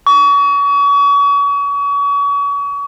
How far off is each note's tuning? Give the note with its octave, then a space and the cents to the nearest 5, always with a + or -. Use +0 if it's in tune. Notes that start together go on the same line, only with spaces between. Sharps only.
C#6 +35